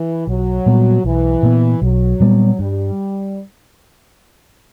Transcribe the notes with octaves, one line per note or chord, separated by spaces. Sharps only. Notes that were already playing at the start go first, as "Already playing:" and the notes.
Already playing: E3
B1 F#3
A#2 G3 B3
B1 E3
A#2 G3 B3
B1 F#3
A#2 G3 B3
G2 G3